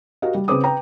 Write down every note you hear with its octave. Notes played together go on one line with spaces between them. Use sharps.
F#4 G4 A#4 D#5 F5
G3
C#3 C4 G#4 B4 D6 D#6
B4 G5 A#5